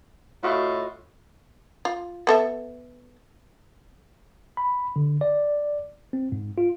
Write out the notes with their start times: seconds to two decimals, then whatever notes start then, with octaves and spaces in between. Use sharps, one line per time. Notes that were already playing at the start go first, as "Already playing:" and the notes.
0.43 A2 F4 F#4 D#5
1.85 F4
2.27 B3 A4 E5
4.57 B5
4.96 D3
5.21 D5
6.13 C4
6.32 G#2
6.58 F4